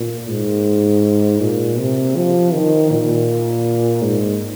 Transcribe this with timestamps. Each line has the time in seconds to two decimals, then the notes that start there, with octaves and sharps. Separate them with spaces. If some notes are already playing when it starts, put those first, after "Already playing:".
Already playing: A#2
0.30 G#2
1.41 A#2
1.79 C3
2.16 F3
2.53 D#3
2.91 A#2
4.02 G#2